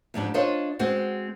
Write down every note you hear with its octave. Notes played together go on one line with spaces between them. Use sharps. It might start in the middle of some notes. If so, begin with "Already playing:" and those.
F2 G#2 D4 G4
D4 F4 C5 C#5 D#5
G#3 C4 F#4